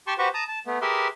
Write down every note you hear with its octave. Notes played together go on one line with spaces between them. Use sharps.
G4 G5 A5 C6 C#6
F#4 G4 B4 C5 C#6
A5 A#5 D#6
A5
A3 B3
G4 G#4 A#4 B4 E5 C6